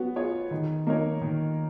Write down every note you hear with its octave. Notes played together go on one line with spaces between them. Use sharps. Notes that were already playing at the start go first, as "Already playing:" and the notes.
Already playing: B3 F#4
F4 G#4 C#5
D#3
A#3 D#4 A#4 C#5
D#3